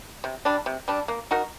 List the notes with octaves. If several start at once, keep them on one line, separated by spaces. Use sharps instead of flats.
C3
G3 D4
C3
G3 D4
A#3
D#4 F#4 A#4